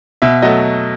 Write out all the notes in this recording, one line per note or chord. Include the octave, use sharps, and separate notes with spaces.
B2 E5
F#3 A3 D#5